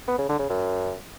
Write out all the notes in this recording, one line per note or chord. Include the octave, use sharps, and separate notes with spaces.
B3
C#3
D3
C#3
F#2